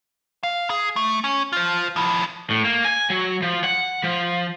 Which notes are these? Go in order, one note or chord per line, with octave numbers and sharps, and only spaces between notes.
F5
G#4
A3
C#4
F4 C5
F3 E4
A2
A#3
G#5
F#3
F3
F#5
F3